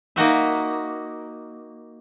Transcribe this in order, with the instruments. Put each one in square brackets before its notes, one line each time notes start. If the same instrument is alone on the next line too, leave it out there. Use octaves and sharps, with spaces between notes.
[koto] A#3 D#4 F#4 E5